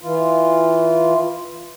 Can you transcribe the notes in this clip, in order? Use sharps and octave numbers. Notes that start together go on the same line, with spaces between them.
E3 F4